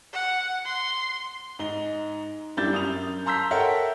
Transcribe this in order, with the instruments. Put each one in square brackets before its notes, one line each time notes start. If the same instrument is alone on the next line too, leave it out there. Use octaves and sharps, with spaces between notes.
[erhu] F#5
C6
[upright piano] G#2 D#5 G7
F#2 G3 D4 E4 G6 A6
F#2 D#6 F7
A5 A#5 C6 E6 G6 B6
A4 A#4 C#5 E5 F#5 G5